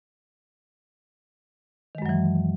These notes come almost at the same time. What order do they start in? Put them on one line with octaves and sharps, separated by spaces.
D#3 G#3 F#2 F#3 E3